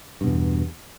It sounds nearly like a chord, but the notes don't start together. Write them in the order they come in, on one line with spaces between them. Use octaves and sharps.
G2 B2 E2